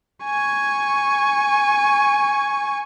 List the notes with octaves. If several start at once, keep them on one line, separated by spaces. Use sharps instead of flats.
G#5 C#6